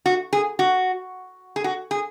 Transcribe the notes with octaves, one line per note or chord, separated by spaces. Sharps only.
F#4
G#4
F#4
G#4
F#4
G#4